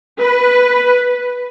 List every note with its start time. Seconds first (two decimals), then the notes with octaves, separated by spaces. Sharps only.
0.19 B4